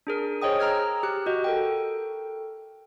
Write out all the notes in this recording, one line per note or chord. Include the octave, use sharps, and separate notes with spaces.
D4 G#4 A#4
G#4 C5 C#5 D#5 G5 D#6
A#5 E6 F6 G#6
G4 F#6
F#4 D#5
A4 A#4 G5